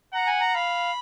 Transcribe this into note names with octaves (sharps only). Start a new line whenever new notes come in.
F#5 A#5
G#5
A#5
F5 B5